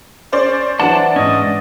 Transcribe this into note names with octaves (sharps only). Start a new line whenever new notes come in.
C#4 C5 D5
E3 F#3 D4 C5 D5 F#5 A5
G#2 C#4 D#5